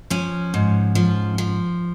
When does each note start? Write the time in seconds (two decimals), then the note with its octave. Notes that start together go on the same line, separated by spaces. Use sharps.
0.10 F3 C#4
0.54 G#2
0.95 F3
1.38 F3